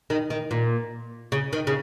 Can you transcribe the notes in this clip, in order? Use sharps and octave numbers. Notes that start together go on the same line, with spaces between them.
D#3
D#3
A#2
C#3
D#3
C#3